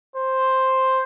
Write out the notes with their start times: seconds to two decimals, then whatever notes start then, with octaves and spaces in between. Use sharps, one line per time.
0.16 C5